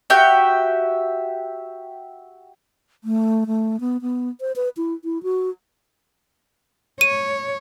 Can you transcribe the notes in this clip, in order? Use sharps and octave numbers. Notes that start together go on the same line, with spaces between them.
F#4 G4 E5 G5
A3
A3
B3
B3
C5
B4
E4
E4
F#4
C#5 D#7